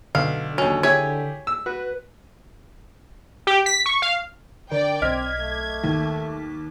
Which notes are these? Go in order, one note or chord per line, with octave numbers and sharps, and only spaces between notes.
B1 D3 F5
D#2 F#3 C#4
E4 G4 G#4 C#5 G#5
E6
F#4 B4
G4
B6
C#6
F5
D3 A#4 D5 G5
B1 C4 D#5 D6 F6 G#6 B6
A3
D#2